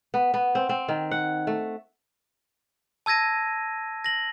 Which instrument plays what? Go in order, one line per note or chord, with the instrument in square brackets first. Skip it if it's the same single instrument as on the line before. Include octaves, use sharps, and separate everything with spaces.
[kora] B3
B3
C4
C4
D#3
F#5
A3
[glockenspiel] A5 E6 G#6 A#6 D#7
A#6 F#7